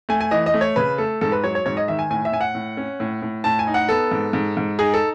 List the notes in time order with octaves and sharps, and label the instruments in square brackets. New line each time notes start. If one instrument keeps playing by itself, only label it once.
[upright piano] A3 G#5
G#5
E3 D#5
D#5
A3
C#5
C#3 B4
A3 A4
G#2 A4
B4
F#3 C#5
C#5
G#2 C#5
D#5
D#3 E5
G#5
A2 G#5
E5
A2 G#5
F#5
A2
C#4
A2
A2
A2 A5
G#5
D#4
F#5
B3 A4
G#2
G#2
G#2
D#4 G#4
A4